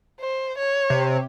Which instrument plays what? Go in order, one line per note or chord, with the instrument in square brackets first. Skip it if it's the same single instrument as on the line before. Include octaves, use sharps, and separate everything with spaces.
[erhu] C5
C#5
[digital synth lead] C3